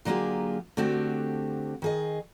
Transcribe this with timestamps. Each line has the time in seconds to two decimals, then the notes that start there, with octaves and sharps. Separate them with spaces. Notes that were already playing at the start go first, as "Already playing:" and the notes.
0.05 D3 F#3 A#3 F4 G4 G#4
0.77 D3 A3 C4 F#4 G4
1.82 D#3 G#4 D#5